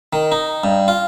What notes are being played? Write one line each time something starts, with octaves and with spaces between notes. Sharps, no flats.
D#3
D#4
G2
F4